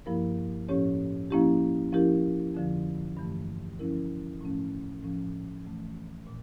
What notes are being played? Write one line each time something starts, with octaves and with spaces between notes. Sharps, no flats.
G2 F3 A#3 E4 A#4
A2 F3 C#4 G4 C#5
F3 A#3 C#4 E4 G4
F3 C#4 E4 G4 A#4
F2 D3 F3
G2 E3 A3
F3 C#4 E4 A#4
A2 F3 A3 C#4
A2 F3 C#4
F2 E3 A3
A#2